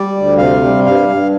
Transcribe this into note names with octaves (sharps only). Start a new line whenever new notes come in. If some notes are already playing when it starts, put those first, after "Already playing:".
Already playing: G3 D5
D2
C3 F5
G3
G2 F5
G2